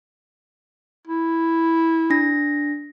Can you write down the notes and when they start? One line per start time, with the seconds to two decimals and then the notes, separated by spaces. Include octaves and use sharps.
1.07 E4
2.10 D4 A#6